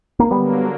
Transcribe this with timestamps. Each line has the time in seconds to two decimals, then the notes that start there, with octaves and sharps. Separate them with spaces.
0.19 A#3
0.31 D3 F#3 G3 A#3 B3